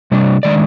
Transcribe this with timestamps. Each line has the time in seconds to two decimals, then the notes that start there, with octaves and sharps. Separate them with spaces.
0.11 C3 G3 D4
0.43 D#3 G#3 D4 D5